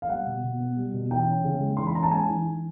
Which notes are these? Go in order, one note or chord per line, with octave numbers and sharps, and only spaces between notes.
F5
G3 F#5
B2
B2
B3
G3
B2
E3 G5
C#4
C#3
G#3
E3 C6
B5
C#4 A#5
A5
G#3 G#5
E3
E3